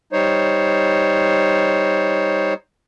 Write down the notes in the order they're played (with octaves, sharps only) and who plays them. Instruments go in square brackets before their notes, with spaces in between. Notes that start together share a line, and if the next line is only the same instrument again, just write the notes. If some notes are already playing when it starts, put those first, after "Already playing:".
[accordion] G3 D#4 C5 C#5